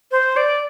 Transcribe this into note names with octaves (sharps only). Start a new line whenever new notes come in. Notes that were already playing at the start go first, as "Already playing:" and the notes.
C5
D5